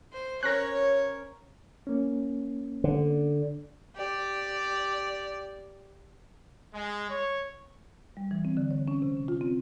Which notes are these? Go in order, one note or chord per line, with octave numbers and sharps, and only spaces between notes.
C5
C#4 A#4 C#5 F#6 A#6
A#3 C#4
D3
G4 D5
G#3
C#5
G3
E3
C4
D3
C#5
C#4
C3
C#4
F4
C4